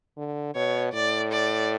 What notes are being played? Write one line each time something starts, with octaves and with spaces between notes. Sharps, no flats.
D3
B2 C#5
A2 D5
D5